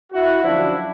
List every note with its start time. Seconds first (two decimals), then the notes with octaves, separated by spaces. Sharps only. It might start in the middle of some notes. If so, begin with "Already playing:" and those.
0.12 E4 F#4
0.42 F#2 D3 F3 D4 E4